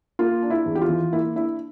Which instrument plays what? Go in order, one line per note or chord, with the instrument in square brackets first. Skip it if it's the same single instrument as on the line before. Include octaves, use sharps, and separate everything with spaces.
[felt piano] A#3 F4
D4
E4
E2
G4
F4
E3
A#3 E4
D4 E4